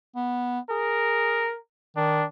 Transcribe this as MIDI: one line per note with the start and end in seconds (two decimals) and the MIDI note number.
0.16 0.59 59
0.70 1.50 68
0.70 1.57 70
1.96 2.23 51
1.96 2.25 62